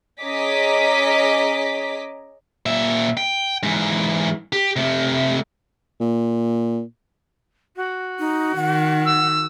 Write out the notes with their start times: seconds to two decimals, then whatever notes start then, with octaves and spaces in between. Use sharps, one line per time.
0.23 C#4 G#4 D#5 A#5 D6 B6
2.66 A#2 E5
3.17 G5
3.63 G#2 E3
4.53 G4
4.76 C3 A3
6.00 A#2
7.76 F#4
8.19 D#4
8.56 D#3 F#5
9.05 E6